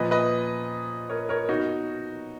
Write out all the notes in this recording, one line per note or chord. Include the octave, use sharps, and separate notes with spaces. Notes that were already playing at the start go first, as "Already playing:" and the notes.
Already playing: A#2 F3 B4 D#5
B4 D#5
A#4 C#5
A#4 C#5
B2 D#4 F#4